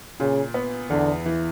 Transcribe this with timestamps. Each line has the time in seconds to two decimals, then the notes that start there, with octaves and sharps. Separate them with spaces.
0.20 A#2 C#3
0.54 B3
0.90 E2 D3
1.26 E3